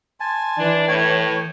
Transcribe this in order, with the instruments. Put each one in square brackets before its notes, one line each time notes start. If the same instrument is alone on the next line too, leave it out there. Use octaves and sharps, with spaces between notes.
[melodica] G#5 A5 [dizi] C6
[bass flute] E3 [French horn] D4
[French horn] A2 [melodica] C#5 G5 [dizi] G#6